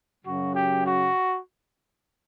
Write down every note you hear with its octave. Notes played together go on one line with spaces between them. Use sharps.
F#2 C#3 F#3 F#4
G4
F#4